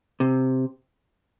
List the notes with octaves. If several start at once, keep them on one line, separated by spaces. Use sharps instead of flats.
C3